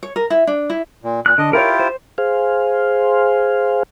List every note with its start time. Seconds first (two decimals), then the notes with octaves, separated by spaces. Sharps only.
0.03 C#5
0.16 A#4
0.30 E4
0.47 D4
0.70 E4
1.03 A#2
1.26 A#2 F#6
1.38 D3 D#5
1.53 E4 F4 G4 A#4 C#5
1.80 C5
2.18 G#4 C5 F5